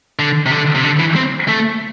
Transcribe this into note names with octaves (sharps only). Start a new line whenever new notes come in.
D3
C3
D3
C3
D3
E3
C4
A3